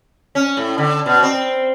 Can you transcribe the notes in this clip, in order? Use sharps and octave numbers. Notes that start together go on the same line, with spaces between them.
C#4
A2
D3
B2
C4